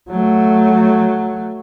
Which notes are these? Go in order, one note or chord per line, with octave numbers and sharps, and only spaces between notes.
F#3 A3